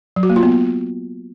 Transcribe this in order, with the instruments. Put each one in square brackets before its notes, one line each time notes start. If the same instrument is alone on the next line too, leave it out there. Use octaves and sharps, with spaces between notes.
[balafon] F#3
F#4
A#3
F4
B3